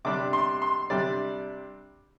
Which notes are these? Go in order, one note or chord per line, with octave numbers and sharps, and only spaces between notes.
C3 G3 D4 D6
C6
C6
C3 G3 D4 D5